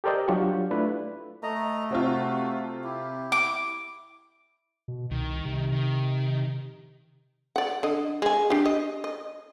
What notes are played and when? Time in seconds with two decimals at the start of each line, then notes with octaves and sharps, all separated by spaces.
0.04 G4 A4 A#4 C5 D5 D#5
0.28 F#3 D4 F4 G4 C#6
0.71 A3 D4 E4 F4 B4
1.43 A3 D#5 A#5
1.90 C3 C4 F4 F#4
2.84 E4 G4
3.32 D6
4.88 B2
5.11 C2 D#3
5.45 C3
5.72 D#3
7.56 D5 F#5
7.83 D3 D#5
8.22 G#3 G#5
8.50 D4 G4
8.65 D#5
9.04 D#5